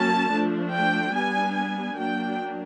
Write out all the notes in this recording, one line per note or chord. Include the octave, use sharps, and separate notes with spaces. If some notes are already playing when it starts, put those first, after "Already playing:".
Already playing: F#3 A#3 C#4 A5
F3 A3 D4
G5
G3 B3 D4 G#5
G#5
F#3 A#3 D4 G5